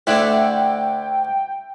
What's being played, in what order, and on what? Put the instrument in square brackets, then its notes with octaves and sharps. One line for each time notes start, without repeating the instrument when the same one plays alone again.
[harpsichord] D2 D3 A3 [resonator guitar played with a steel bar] E4 D5 [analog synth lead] G5